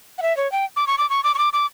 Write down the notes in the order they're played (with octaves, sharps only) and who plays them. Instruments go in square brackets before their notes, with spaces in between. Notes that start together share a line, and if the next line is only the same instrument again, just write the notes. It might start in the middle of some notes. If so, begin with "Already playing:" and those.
[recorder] F#5
E5
C#5
G5
D6
C#6
D6
C#6
D6
C#6
D6
D6